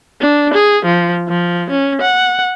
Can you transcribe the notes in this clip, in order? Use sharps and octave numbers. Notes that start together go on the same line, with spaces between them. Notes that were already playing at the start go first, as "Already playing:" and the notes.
D4
G#4
F3
F3
C#4
F#5